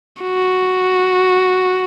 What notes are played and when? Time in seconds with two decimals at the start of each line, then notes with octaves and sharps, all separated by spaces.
0.23 F#4